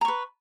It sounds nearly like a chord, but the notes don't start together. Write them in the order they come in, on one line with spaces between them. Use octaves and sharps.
A#5 C#6 B4